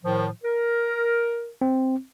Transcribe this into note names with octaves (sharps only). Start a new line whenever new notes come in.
A2 D#3 F3
A#4
C4